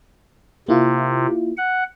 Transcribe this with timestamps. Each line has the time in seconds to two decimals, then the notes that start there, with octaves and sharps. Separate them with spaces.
0.68 C3 A#3 E4 F4
1.57 F#5